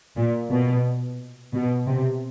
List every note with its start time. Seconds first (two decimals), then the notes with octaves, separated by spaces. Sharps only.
0.16 A#2
0.50 B2
1.53 B2
1.87 C3